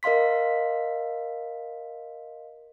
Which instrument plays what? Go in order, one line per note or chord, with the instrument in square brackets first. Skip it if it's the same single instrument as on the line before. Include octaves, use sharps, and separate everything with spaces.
[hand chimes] A#4 D#5 F5 C6 B6